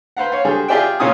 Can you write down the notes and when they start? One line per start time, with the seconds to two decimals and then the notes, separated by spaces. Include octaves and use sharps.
0.17 B4 C5 F5 F#5
0.32 C#5 F5
0.45 D3 G3 G#4 C5
0.68 F4 G4 G#4 D5 E5 G5
1.00 A#2 C#3 C#4 F4 G#5 D#6